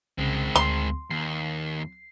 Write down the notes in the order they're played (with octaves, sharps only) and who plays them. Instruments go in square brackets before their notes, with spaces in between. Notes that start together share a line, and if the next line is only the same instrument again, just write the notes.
[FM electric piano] C2 C#3 [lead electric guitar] G#3 C4
[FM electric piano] D2 [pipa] C6
[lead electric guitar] D#2 [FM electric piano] C7